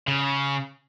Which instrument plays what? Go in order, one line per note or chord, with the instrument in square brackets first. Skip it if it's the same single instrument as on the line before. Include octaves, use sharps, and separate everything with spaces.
[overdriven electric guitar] C#3